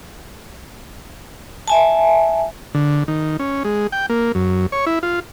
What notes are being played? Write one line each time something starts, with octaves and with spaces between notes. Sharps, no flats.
E5 G#5 A5
D3
D#3
C#4
G#3
G5
A#3
F#2
C#5
E4
F4